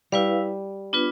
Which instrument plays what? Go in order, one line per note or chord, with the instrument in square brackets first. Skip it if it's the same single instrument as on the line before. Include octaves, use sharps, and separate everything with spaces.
[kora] G3 [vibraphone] E4 B4 F5
[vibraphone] B3 D4 F4 B4